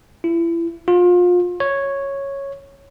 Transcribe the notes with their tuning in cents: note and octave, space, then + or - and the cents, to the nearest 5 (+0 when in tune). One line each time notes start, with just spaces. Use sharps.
E4 +30
F4 +30
C#5 -5